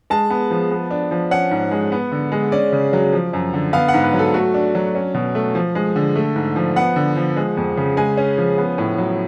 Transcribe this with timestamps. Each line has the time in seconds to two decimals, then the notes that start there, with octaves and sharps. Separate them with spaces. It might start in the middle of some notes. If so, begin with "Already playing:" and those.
0.10 G#3 A5
0.30 B3
0.51 F3
0.71 B3
0.91 D4
1.11 F3
1.31 C#4 F#5
1.51 G#2
1.71 G#3
1.92 B3
2.12 D3
2.32 G#3
2.52 C#4 D5
2.72 C#3
2.93 F#3
3.13 F3
3.33 F#2
3.54 D3
3.73 B3 F5
3.88 F#5
3.94 G#2
4.04 B4
4.14 F#3
4.19 A4
4.34 A3 F#4
4.54 D4
4.75 F#3
4.95 C#4
5.15 B2
5.35 A3
5.55 F3
5.75 G#3
5.96 D3
6.16 A3
6.36 G#2
6.56 F3
6.76 B3 F#5
6.96 D3
7.16 F3
7.36 G#3
7.57 F2
7.77 C#3
7.97 G#3 G#5
8.17 C#4
8.38 F3
8.58 B3
8.78 A2
8.98 F#3